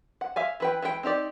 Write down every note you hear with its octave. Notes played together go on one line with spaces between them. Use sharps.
F#5
E5 F5 G#5
E3 B4 G5
E3 G#3 F#4 G5
C4 D#4 G4 D5